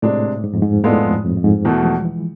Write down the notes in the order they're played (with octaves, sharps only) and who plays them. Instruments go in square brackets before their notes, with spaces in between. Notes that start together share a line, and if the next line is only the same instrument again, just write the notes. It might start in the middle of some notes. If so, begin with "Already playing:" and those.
[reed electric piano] A2 [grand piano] C3 G#3 D4 G#4 D5
[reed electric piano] G#2
F2
G#2
[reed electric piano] A2 [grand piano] G#3 B3 F4 A4 D5
[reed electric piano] F2
F2
F2
G#2
[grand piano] E2 B2 A3 [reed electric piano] E3
[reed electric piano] G#3
F3
E3